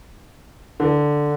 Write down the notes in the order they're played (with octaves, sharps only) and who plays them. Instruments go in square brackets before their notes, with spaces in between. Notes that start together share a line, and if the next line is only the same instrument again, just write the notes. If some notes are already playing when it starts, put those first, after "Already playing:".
[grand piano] D3